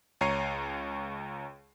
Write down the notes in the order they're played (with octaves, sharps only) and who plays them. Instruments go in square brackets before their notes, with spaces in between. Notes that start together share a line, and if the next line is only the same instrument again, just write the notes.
[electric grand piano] C#2 C#5 A#5 C7 C#7 D#7